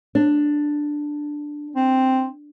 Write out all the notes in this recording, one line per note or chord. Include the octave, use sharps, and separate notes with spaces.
D4
C4